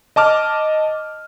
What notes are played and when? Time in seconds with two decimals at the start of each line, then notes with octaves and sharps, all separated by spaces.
0.16 D#5 A5 D6 F6